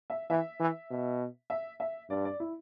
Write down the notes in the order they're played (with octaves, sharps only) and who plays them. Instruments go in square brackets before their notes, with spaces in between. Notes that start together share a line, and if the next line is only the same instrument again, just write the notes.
[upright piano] E5
[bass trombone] E3 [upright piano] E5
[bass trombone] E3
B2
[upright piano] E5
E5
[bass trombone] G2 [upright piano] D5
[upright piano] D5
E4